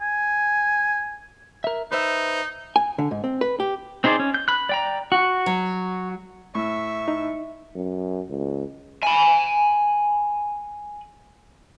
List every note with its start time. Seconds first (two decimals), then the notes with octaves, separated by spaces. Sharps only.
0.01 G#5
1.64 A#4 E5
1.92 D#4 B4 C5 E5
2.76 G#5
2.98 D3
3.11 G#2
3.24 C4
3.41 B4
3.60 G4
4.04 C4 D#4 G#4 C5 D5
4.20 C#4
4.34 G6
4.48 B5 F#6
4.69 D5 G5 A#5
5.12 F#4
5.46 F#3
6.55 A2 E5 C#6
7.08 D#4
7.75 F#2
8.29 C#2
9.03 G#5 B5